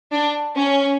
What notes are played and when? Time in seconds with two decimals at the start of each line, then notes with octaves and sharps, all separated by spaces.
0.12 D4
0.56 C#4